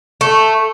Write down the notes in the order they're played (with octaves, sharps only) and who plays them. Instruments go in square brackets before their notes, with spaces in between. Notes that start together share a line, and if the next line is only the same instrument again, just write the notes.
[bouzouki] A3